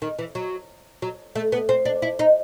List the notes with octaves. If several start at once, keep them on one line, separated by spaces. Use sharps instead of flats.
D#3
E3
F#3
F#3
A3
B3
C4
D4
E4
D#4